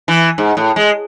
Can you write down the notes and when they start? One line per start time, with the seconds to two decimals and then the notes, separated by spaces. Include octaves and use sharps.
0.08 E3
0.38 G#2
0.57 A2
0.76 G#3